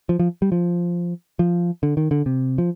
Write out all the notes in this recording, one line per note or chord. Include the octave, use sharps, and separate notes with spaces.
F3
F3
G3
F3
F3
D3
D#3
D3
C3
F3